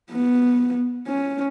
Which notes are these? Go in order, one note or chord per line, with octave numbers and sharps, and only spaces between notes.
B3
C#4